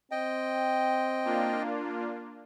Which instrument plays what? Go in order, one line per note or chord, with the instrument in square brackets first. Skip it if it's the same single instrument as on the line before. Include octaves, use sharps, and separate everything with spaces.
[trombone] C4 [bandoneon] D#5 G5
[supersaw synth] A#3 D4 F4